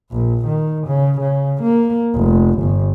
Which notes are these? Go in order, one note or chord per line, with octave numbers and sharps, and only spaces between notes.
A#1
D#3
C#3
C#3
A#3
F1
G1